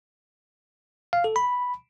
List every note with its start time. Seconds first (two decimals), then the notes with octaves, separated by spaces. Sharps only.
1.13 F5
1.24 A4
1.36 B5